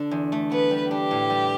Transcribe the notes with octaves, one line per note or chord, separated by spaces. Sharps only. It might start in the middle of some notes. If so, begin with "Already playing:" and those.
Already playing: D3 D4
E2
A3
B3 B4
G3
D4 G4
A2
G3